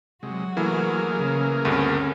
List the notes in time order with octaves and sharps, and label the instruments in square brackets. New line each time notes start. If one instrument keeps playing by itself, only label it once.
[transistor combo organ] C3 G#3 [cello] F#3 F#4
[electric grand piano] E3 A3 [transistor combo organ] A#3 G#4 A#4
[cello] C#3
[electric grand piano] D2 G2 D3 [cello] C4 C#4